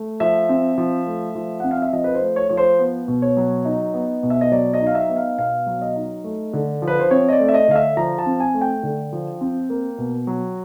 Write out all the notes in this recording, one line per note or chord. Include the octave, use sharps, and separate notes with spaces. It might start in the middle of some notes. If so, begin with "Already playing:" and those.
Already playing: A3
F3 E5
C4
F3
A3
F3
C4 F#5
F5
E5
F3 D#5
B4
C5
A3
C#5
F3 C#5
C5
B3
B2
C#5
F#3
D#4
B3
B2
E5
D#5
F#3 D5
D#5
D#4
F5
E5
B3
F5
B2 F5
F#3
D#5
D#4
A3
D3
F3
B4
C5
C4 C#5
D#5
D5
A3
E5
D#5
D3 F5
E5
F3 A#5
A5
C4
G#5
A3
G5
D3
F3
C4
A#3
B2
F#3